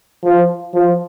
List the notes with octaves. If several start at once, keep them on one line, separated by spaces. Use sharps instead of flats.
F3
F3